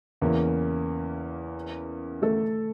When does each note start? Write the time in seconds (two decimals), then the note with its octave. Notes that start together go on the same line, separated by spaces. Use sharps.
0.22 E2 C#3 E3 A#3 C#4
2.22 A3 A4